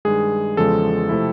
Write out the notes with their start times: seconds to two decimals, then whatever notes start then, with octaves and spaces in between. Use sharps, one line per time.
0.05 G2 D#3 G#3 G#4
0.57 E2 C#3 F3 G#3 A4
1.09 C3 F3 A3 C4 E4